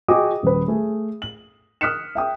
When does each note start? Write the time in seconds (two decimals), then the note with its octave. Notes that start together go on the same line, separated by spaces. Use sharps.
0.08 F#4 G#4 D#5 G5 D6 D#6
0.43 D#1 B4
0.68 A3 G#4
1.22 F#7
1.81 D#6 F6 F#6 B6 C#7 E7
2.15 E5 G5 D#6